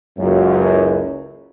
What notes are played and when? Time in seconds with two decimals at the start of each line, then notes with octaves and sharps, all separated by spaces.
0.18 F#1 C#2 F#2